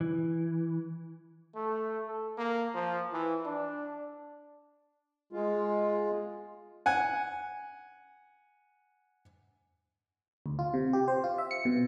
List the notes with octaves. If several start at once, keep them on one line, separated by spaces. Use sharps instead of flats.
E3
A3
A4
A#3
F3
E3
D4
G#3 F4
F#5 G#5
D2
F4
C3
G4
C5
F4
E5
C#7
B2